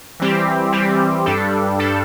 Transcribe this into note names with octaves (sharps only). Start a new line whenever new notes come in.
E3 G3 C4 G4
E3 G3 C4 G4
G2 G3 D4 A4
G2 G3 D4 A4